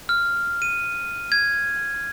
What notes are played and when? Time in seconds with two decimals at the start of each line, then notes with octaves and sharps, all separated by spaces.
0.09 F6
0.62 D#7
1.32 G#6